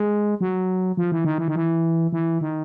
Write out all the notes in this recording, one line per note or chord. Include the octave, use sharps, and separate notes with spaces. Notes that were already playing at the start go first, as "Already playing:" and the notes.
Already playing: G#3
F#3
F3
E3
D#3
E3
D#3
E3
E3
D#3